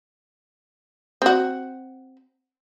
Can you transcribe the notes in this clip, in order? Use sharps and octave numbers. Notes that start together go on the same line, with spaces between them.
C4 F#4